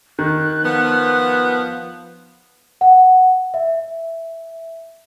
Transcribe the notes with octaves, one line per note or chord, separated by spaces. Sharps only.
D#3 F#6
F3 B3
F#5
E5